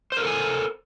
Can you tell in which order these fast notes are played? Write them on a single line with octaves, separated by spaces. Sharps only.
C5 A#4 A4 G#5